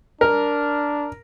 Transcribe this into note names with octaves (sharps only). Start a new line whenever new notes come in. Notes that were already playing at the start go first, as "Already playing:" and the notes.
D4 A#4